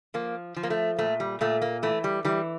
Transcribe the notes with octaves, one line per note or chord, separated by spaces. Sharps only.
F3 A#3
F3
A#3
A3
A#2 A3
G3
A#2 A3
A#3
E3 A3
G3
E3 G3